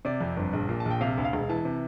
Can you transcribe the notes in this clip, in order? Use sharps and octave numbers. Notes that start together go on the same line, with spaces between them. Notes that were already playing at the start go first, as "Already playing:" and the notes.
C3 D5
F2
G1
A#1
A#2
A5
A#1 G5
C3 F5
D2
F5
E1
E3 A5
C3